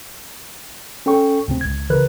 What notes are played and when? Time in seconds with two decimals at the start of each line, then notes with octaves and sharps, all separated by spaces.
1.06 C#4 A4 G5 C#6
1.48 D2 C3 C4
1.61 C#2 G#6
1.90 C#3 E3 A#4 B4 F#6